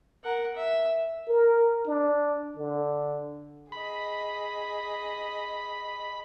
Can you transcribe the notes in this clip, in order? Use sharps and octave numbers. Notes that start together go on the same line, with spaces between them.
A#4 F#5
E5
A#4
D4
D3
G#4 D#5 B5